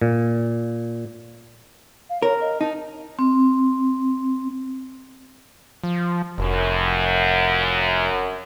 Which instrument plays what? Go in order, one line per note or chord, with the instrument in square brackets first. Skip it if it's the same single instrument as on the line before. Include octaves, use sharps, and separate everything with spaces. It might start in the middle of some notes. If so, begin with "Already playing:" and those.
[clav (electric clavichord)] A#2
[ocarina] F5
[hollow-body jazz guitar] A#4 [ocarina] C#5
[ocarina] D#5
[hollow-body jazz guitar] D#4 [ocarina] A5
[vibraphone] C4
[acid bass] F3
[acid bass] F1 [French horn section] F#2